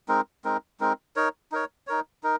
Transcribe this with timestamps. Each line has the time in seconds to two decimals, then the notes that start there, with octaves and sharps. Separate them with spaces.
0.08 G#3 C4 D#4 A#4
0.45 G#3 C4 D#4 A#4
0.80 G#3 C4 D#4 A#4
1.16 D#4 A#4 C#5
1.52 D#4 A#4 C#5
1.87 D#4 A#4 C#5
2.23 D#4 A#4